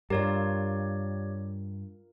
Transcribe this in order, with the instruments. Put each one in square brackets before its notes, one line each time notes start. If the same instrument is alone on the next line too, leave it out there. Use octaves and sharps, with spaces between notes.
[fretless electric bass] G2 [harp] F4 A#4 [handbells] G4 C#5 D5